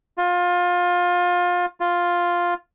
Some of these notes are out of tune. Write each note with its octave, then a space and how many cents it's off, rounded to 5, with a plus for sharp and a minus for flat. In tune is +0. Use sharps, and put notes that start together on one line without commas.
F4 +25
F4 +5